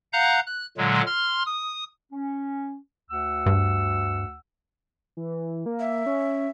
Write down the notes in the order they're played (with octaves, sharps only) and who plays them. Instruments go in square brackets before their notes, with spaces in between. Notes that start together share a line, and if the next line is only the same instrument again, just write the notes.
[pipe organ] F5 F#5 A#5 F#6 G6
F#6
A#2 D3 F#3 G#3
C6 F6
D#6
[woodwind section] C#4
D2 F#5 E6
[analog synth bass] G2
[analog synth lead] E3
A#3
[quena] E5
[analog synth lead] C#4